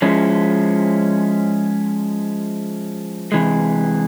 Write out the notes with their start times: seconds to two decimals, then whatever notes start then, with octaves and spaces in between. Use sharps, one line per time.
0.02 F3 G#3 C#4 E4
3.32 C3 E3 G#3